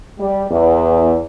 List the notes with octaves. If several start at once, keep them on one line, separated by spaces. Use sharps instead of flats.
G3
E2